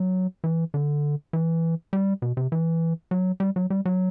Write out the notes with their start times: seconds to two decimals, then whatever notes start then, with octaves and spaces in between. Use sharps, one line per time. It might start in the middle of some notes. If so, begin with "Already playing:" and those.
Already playing: F#3
0.44 E3
0.74 D3
1.33 E3
1.93 G3
2.22 B2
2.37 C3
2.52 E3
3.11 F#3
3.40 G3
3.56 F#3
3.70 G3
3.85 F#3